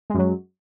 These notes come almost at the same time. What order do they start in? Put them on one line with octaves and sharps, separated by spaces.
G#3 F#2 F#3